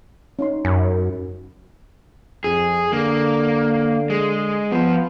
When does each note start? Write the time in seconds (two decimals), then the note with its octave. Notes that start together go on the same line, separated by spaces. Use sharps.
0.39 C#4 D#4 C6
0.65 F#2 G#5 B5
2.44 F2 G#4
2.93 D3 A#3
4.10 G#3
4.72 F3 B3